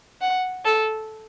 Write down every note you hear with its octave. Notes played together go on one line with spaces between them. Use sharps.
F#5
A4